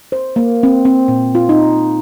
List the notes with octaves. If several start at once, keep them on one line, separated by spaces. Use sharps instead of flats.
C5
A#3
C4
C4
A#2
F4
D#4